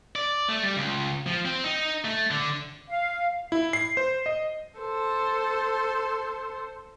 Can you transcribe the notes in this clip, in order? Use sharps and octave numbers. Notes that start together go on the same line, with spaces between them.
D5
A3
G3
C#2
F3
C4
D#4
A3
D3
F5
E4
C7
C5
D#5
A4 C5